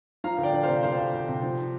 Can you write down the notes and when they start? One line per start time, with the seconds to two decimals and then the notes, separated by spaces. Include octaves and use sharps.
0.24 F3 F5 A#5
0.38 D2
0.43 D5 G5
0.53 D2
0.63 C3 C5 F5
0.83 F3 C5 F5
0.98 D2
1.14 D2
1.28 C3
1.43 F3